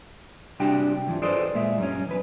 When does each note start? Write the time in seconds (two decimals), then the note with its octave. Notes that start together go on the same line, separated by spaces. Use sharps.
0.60 C3 G3 D4 F#4 G4
1.06 G2 E3 F3
1.22 G#4 A4 B4 C5 D5
1.55 A#2 G#3 E5
1.78 F#2 G3 C#4
2.06 E2 B4